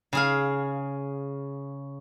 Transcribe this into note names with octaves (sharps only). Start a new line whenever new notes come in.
C#3 G#4 F5